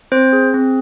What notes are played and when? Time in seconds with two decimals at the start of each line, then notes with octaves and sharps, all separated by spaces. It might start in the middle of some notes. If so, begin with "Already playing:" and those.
0.12 C4 C5
0.33 G#4
0.54 C4